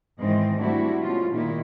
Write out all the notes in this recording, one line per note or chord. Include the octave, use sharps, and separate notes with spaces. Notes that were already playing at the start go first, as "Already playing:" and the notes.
G#2 D#3 E3 G#3 C4 D#5
G3 A3 C4 D4 E4 F#4
B2 F3 G#3 A3 C#4 F4
A#2 D#3 D#4 E4 G4